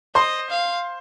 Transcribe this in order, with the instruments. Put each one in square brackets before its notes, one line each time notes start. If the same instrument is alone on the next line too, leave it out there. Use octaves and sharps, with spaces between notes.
[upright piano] C5 C6 [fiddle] D#5
[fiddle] F5